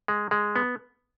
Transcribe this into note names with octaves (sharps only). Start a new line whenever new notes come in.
G#3
G#3
B3